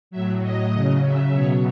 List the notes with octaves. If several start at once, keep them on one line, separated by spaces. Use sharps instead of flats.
A2 F#3 E5
D#5
C#3 F#3 D#5
E5
B2 F#3 C#5